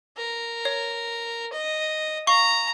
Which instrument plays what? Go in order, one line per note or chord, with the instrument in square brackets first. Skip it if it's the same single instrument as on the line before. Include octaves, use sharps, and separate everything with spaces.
[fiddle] A#4
[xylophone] C#5
[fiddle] D#5
[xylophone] F5 C#6 G7 [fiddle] A#5